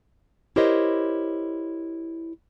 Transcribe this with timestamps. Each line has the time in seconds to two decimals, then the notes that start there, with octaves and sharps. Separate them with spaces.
0.56 E4 G4 A#4 C5 C#5 D#5